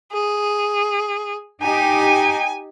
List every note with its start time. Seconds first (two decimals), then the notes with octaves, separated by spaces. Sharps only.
0.13 G#4
1.62 D#4 G4 G#5